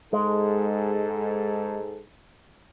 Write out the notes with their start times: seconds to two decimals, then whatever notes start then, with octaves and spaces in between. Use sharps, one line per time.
0.13 G#2 G#3 A4